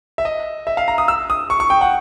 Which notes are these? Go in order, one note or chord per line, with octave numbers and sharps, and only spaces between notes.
E5
D#5
E5
F5
A#5
D#6
E6
D#6
C#6
C#6
G5
F#5